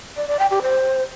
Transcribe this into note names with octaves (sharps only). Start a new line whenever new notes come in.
D5
D5
G5
G4
C5